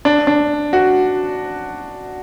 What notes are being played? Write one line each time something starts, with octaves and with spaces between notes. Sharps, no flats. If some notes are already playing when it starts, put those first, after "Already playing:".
D4
D4
F#4